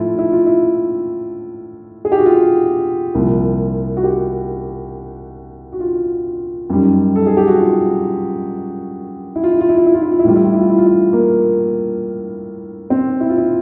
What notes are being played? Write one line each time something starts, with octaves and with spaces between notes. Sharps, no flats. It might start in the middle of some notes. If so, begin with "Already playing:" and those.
Already playing: A2 F3 E4 F4
E4
F4
E4
G#4
G4
F#4
F4
C2 A#2 F3
F#4
G4
F#4
F4
F#2 D#3 G3
A4
G#4
G4
F#4
F4
E4
F4
E4
F4
E4
F4
E4
F4
E4
F4
E4
A2 E3 G3 F4
E4
F4
E4
F4
E4
F4
E4
A#3
C4
E4
F4
E4